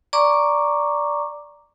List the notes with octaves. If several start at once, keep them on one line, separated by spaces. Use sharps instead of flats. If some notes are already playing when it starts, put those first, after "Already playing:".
D5 A#5 C#6 D6